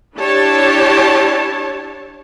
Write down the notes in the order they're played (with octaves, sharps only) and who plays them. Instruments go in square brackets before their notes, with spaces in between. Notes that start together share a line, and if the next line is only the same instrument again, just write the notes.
[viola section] D4 E4 G4 C#5 A5